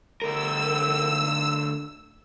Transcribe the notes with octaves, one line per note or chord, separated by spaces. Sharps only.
D2 A#4 E6